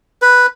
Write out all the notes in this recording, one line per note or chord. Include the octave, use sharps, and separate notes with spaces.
B4